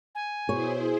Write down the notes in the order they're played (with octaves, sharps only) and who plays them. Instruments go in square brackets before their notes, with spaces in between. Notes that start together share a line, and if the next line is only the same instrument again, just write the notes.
[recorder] G#5
[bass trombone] B2 [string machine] E4 G#4 C5 [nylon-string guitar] C#5